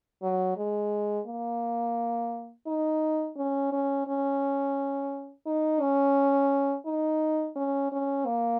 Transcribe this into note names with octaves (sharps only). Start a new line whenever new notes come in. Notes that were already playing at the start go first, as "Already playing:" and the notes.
F#3
G#3
A#3
D#4
C#4
C#4
C#4
D#4
C#4
D#4
C#4
C#4
A#3